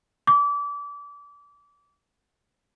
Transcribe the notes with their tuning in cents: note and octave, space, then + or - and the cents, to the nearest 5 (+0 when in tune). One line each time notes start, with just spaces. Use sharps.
D6 -30